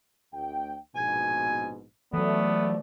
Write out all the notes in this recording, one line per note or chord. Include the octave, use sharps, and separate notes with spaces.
D2 G5
A#1 G#2 B2 G#5
E3 F#3 A3 B3 D5